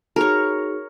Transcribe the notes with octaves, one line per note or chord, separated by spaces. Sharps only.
D#4 F#4 G#4 A#4 C#5